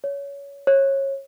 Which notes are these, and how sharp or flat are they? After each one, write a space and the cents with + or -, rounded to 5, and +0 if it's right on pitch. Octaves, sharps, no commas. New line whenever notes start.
C#5 +20
C#5 -25